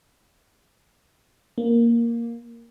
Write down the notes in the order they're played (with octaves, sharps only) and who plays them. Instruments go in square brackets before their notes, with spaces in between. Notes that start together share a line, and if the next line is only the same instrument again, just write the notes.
[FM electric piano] A#3